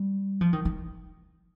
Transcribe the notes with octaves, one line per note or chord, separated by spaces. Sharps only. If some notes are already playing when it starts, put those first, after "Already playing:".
Already playing: G3
F3
D#3
D#3